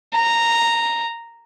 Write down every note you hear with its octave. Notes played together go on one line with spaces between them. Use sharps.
A#5